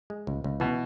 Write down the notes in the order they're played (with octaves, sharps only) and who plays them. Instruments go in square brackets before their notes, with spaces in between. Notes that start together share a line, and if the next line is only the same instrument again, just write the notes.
[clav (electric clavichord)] G#3
C#2
C#2
[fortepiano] B2 [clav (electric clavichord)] E3